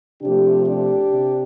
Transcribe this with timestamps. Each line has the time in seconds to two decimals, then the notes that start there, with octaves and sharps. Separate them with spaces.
0.22 C3 F3 A3 D4 G4
0.67 D4 G4
1.12 C3